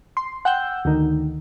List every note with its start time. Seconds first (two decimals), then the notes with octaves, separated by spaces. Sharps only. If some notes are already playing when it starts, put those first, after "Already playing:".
0.17 C6
0.45 F#5 G5 E6 G6
0.85 D2 D#3